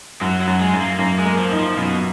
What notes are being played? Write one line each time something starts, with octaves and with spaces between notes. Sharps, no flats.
F#2 F#3
F#3
F#2
G#3
F#2
A#3
F#2 A#3
G#3
A#3
F3
D#4
F3
F#2 B2